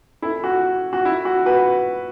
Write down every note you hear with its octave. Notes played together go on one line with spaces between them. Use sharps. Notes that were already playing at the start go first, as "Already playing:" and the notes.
E4 A4
F#4
F#4
E4
F#4
F#4 B4